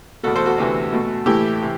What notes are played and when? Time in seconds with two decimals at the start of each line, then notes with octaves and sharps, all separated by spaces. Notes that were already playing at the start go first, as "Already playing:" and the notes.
0.23 E2 B2 A3 F#4 A4
0.36 A4 C5
0.46 F#4 A4
0.58 D2 C3 E3 B3
0.93 B2 A3
1.26 A2 E3 A3 E4 G4
1.62 C3 E3